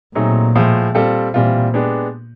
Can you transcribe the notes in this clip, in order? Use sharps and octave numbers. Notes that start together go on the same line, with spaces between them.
A#2 F#3 A3 C4 D#4 G#4
A2 F3 G#3
G3 C4 F4 A4
A#2 E3 G3 C4 F4
G#3 B3 D4 G4